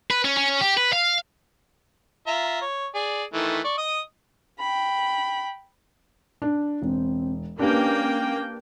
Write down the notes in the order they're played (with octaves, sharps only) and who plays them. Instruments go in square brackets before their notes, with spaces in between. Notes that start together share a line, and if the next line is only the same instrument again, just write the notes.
[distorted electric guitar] B4
C#4
C#4
G4
B4
F5
[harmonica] F4 E5 A#5
C#5
G#4 D5
D#3 E3 A3
D5 C#6
D#5 D#6
[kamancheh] G5 B5
[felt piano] D4
[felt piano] E1 [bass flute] C4
[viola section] A#3 G5 [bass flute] C#4 [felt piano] D4 G4 B4